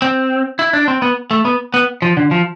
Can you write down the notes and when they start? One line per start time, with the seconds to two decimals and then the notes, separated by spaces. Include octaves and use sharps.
0.02 C4
0.59 E4
0.73 D4
0.88 C4
1.02 B3
1.31 A3
1.45 B3
1.74 B3
2.02 F3
2.17 D3
2.31 F3